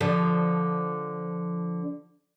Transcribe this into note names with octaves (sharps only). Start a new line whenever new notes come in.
D3 F3